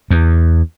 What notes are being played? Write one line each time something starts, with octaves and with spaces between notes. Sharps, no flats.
E2